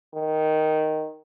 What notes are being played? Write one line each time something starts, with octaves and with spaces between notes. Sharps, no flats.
D#3